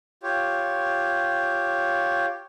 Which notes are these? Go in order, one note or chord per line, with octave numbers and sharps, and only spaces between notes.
F4 G4 C#5